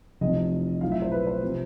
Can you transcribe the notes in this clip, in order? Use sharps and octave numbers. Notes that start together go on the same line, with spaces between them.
F1 F2 C3 E3 D#5
B1 A2 F3 F5
E5
C5
B4
C5
C3 F3